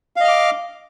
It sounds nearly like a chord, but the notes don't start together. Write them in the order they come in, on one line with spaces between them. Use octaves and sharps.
F5 D#5 F6 D6